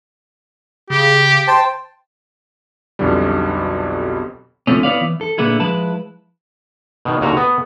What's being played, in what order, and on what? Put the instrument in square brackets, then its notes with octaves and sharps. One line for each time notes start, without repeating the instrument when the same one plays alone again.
[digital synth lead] C#3 [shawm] G4
[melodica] C5 G5 A5
[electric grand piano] B1 F2 B2 D3 G3
[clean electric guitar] C#2 D3 F3 A3 C4 C#4
B3 E4 B4 C#5 D5 F5
E3
A4
A#2 D3 A#3 B3 E4 G#4
F3 G#3 E4 B4 A5
[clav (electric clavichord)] B2 D#3
D#2 D3 F#4 A#5
B3